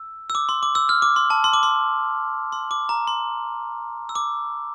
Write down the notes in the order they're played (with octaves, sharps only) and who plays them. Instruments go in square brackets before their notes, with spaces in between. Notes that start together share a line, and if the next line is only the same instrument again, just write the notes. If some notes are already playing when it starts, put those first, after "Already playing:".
Already playing: [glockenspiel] E6
E6
D6
C6
D6
E6
F6
D6
C6
A5
C6
D6
C6
C6
D6
A#5
C6
E6
D6